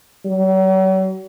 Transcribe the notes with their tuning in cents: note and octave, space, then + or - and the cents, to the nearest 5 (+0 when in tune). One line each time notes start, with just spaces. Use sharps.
F#3 +40